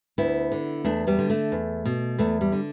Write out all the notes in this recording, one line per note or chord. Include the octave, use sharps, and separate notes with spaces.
D2 B3 E4
D3
E2 A3 D4
G3 B3
D3
A3
E2
B2
E2 A3
G3
D3